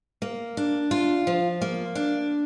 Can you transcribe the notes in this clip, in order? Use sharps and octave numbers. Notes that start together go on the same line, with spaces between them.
A#3
D4
F4
F3
A#3
D4